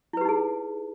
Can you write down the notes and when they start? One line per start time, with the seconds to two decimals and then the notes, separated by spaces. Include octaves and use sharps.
0.13 E4
0.17 B4
0.21 G4
0.25 D#4
0.29 G#4